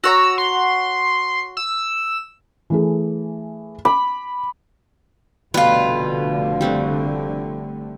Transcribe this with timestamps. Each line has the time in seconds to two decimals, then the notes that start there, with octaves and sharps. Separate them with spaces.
0.04 F#4 C#5 A#5 E6
0.38 C6
1.57 E6
2.70 E3 A3 G#4
3.85 B5 D6
5.54 F1 B2 D3 G3 A3 F4 B4
6.61 G3 C4 F#4